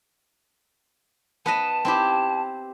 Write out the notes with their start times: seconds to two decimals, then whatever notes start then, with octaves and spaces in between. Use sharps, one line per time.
1.46 B3 B4 D#5 A5
1.85 C4 E4 G4